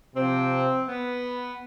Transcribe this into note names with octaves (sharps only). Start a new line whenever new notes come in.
C3 F3 C4
B3